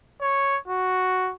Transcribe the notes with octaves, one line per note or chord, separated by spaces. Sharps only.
C#5
F#4